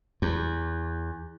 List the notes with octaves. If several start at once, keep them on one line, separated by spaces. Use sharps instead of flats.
E2